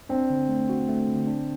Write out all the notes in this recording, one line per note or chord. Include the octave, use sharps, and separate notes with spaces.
C4 D4
D3
A3
F#4
A3
D3
D4